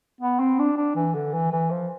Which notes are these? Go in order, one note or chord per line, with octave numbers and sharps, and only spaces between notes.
B3
C4
D4
D4
E3
D3
E3
E3
F3